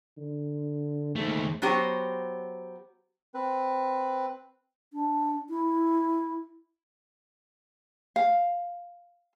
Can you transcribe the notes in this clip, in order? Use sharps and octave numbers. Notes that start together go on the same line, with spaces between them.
D3
D#2 G#2 A3
F#3 B3 F#4 G4 C5 C#5
C4 B4
D4
E4
F5